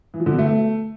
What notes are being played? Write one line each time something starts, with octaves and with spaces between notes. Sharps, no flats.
E3
F3
D3
B2
A3